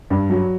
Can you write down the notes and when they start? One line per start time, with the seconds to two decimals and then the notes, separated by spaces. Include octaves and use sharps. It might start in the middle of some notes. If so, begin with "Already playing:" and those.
0.10 G2
0.30 F#3